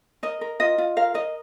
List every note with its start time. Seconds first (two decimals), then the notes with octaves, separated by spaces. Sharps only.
0.23 A#4 D#5
0.41 A#4
0.60 F4 D#5
0.78 F4
0.97 A#4 F5
1.14 A#4 D#5